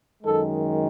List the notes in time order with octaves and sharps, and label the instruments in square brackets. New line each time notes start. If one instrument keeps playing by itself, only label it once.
[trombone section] F#2 D#3 G#3 A4